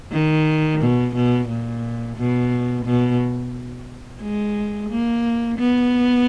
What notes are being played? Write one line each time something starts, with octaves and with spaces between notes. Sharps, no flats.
D#3
B2
B2
A#2
B2
B2
G#3
A#3
B3